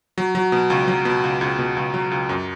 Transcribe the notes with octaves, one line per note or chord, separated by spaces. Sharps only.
F#3
F#3
B2
C#2
F#3
B2
C#2
C#2
B2
C#2
F#3
C#2
F#2